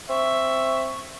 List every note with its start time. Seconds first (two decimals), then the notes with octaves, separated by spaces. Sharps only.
0.09 C4 E5 C#6